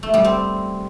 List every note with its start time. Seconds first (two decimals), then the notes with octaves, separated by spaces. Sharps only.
0.03 A3
0.14 G3
0.24 C4